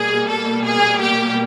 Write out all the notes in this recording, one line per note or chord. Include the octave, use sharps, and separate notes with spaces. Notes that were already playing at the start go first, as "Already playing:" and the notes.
Already playing: B2 G3 A#3 G#4
A4
G#4
G4